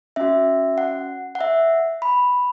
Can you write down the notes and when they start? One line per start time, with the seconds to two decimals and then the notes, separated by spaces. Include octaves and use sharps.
0.16 C#4 F#4 E5
0.78 F#5
1.35 F#5
1.41 E5
2.02 B5